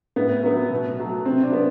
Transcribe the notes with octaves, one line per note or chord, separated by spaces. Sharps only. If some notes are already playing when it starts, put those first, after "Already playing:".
A2 B3
F#3 B3
B2
F#3 A3
C3 C4
D4
B3